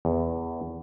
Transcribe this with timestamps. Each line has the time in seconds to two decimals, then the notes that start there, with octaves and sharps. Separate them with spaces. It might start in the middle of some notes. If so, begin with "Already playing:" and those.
0.05 E2